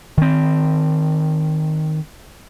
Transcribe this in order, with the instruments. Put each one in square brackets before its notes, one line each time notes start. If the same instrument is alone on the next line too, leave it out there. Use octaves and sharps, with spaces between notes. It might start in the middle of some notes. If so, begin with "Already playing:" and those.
[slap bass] D#3 C4